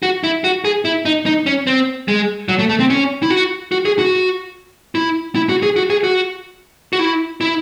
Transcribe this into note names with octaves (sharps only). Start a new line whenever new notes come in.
F#4
E4
F#4
G#4
E4
D#4
D#4
C#4
C4
G#3
F#3
A3
A3
C4
C#4
E4
F#4
F#4
G#4
F#4
E4
E4
F#4
G#4
F#4
G#4
F#4
F#4
E4
E4